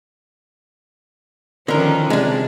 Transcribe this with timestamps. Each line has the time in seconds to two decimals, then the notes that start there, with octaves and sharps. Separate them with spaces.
1.68 D3 D#3 F3 C#4 A#4
2.10 C3 G#3 D4